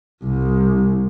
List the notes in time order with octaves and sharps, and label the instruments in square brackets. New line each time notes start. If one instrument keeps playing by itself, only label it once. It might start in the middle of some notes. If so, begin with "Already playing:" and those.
[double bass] C2